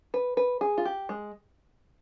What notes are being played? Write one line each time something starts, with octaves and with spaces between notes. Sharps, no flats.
B4
B4
G#4
F4
G4
G#3